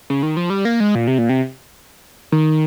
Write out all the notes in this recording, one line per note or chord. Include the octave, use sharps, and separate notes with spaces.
C#3
D#3
F3
G3
A#3
G#3
A#2
C3
A#2
C3
D#3